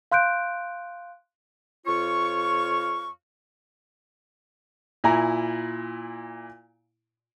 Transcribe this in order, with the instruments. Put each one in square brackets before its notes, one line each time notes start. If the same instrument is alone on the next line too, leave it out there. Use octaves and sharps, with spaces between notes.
[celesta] F5 C6 F#6 G6 D7
[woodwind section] F2 F4 C#5 F5 C#6
[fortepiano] A#2 E4 G#5 A#5